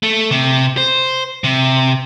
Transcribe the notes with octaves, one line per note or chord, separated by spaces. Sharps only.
A3
C3
C5
C3